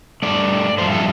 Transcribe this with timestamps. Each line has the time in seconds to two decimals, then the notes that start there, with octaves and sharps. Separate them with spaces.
0.22 G2 F3 A3 D5
0.78 G2 F3 A3 C5
0.91 A4